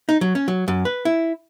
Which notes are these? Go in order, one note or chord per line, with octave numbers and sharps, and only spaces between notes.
D#4
F#3
C#4
F#3
F#2
B4
E4